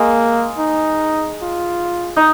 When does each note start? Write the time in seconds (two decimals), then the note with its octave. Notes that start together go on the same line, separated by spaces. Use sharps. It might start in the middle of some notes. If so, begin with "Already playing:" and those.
Already playing: G#3 A#3
0.59 D#4
1.42 F4
2.16 D#4